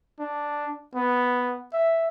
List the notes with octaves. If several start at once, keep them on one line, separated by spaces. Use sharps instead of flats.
D4
B3
E5